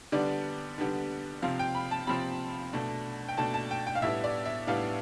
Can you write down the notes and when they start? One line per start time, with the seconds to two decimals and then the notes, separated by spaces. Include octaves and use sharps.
0.12 D3 G3 B3 D4 D5
0.78 D3 G3 B3 D4
1.42 C3 F3 C4 F5
1.59 G5
1.75 B5
1.91 A5
2.07 C3 F3 C4 B5
2.73 B2 A3 D4
3.28 G5
3.37 B2 A3 D4 A5
3.54 A5
3.71 G5
3.87 G5
3.95 F5
4.02 A2 G3 B3 D4 E5
4.24 D5
4.46 E5
4.67 A2 G3 B3 D4 F5